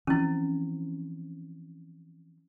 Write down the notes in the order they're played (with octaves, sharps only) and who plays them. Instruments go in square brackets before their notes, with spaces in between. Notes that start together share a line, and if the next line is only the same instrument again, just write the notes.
[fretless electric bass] E3 F3 C4 [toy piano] C#4 E4